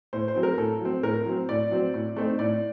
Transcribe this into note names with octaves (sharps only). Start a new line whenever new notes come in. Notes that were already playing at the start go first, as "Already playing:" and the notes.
A2 C5
C5
F#3 C4
A#4
A2 A4
F#3 C4
A2 A#4
F#3 C4
A2 D5
F#3 C4
A2
A3 C4 D#4
A2 D5